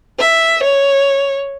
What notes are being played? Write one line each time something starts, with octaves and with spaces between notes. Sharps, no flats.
E5
C#5